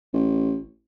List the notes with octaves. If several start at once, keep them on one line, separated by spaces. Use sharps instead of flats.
A1